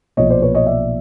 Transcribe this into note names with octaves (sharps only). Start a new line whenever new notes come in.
B1 A#2 F3 C#5 D#5
C5 D5
B4 C#5
C#5 D#5
D5 E5